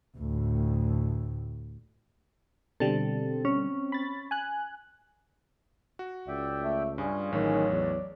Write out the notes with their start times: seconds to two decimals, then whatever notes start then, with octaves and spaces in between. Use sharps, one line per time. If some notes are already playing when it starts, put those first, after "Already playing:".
0.18 D2 A2
2.80 B2 D3 G3 C4 A4
3.45 C#4
3.92 B5 A6
4.31 G#5 F#6
5.99 F#4
6.28 C#2 D5 E5 G5
6.62 A3
6.98 G2 G3 C#4 F4 G#4
7.32 A1 A2 D#3 F#3
7.71 E2 D5